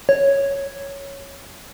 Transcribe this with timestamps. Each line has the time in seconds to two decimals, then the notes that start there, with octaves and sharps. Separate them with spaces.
0.09 C#5